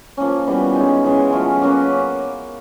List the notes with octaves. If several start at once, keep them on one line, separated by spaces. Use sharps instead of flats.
F3 A#3 C#4
E3 G3 B3
D#3 G#3 C#4
C#3 E3 G#3
F#3 A3 C#4 F4
A#3 C#4 F#4 B4